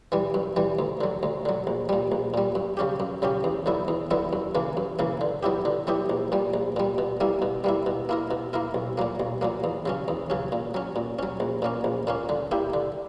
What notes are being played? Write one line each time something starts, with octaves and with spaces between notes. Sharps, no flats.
E3 G3
F#2
E3 G3
D2
D3 F#3
D2
D3 F#3
A#1
A#2 G3
A#1
A#2 G3
F#2
C#3 F#3 C#4 G4
F#2
C#3 F#3 C#4 G4
E2
D3 F#3 B3 E4
E2
D3 F#3 B3 E4
F#2
C#3 E3 A#3
F#2
C#3 E3 A#3
D3
F#3 B3 E4 G4
D3
F#3 B3 E4 G4
A#1
A#2 G3
A#1
A#2 G3
B2
G3 A#3 E4
B2
G3 A#3 E4
B2
A#3 E4 A#4
B2
A#3 E4 A#4
B1
A#2 F#3 A#3
B1
A#2 F#3 A#3
E2
C#3 F#3 C#4
E2
C#3 F#3 C#4
A#2
F#3 C#4
A#2
F#3 C#4
A#1
A#2 A#3 C#4
A#1
A#2 A#3 C#4
D3
A#3 E4 G4
D3